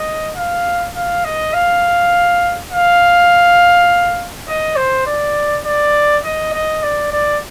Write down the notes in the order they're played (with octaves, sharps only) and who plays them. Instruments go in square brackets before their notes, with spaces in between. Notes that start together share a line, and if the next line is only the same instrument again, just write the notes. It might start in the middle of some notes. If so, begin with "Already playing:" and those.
Already playing: [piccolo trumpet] D#5
F5
F5
D#5
F5
F5
D#5
C5
D5
D5
D#5
D#5
D5
D5